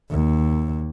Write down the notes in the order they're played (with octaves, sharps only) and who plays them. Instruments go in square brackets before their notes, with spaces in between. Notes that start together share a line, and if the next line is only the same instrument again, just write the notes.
[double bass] D#2